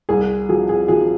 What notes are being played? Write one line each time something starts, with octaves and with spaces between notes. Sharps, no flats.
C2 G#4
F3 G#4
G#4
F3 G#4